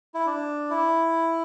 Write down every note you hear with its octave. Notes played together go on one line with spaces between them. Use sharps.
E4
D4
E4